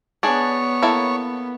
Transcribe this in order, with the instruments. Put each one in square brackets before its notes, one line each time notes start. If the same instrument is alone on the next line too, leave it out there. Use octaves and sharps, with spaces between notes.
[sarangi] B3 [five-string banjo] D4 G#4 [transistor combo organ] C#5
[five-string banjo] A#3 E4 A4